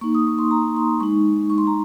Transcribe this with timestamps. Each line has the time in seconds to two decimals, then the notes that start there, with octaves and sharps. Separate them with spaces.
0.01 A#3 D#4 C#6
0.15 D#6
0.27 C#6
0.39 C6
0.51 A#5
0.77 C6
1.00 G#3 D#4 C#6
1.50 C#6
1.58 C6
1.67 A#5